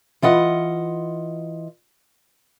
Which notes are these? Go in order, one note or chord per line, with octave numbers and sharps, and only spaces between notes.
E3 F4 D#5 F#5